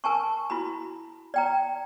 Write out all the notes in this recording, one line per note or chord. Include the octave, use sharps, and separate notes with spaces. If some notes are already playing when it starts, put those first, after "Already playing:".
A#4 G#5 A5 C#6
E4 F#4 B5
D5 G5 A#5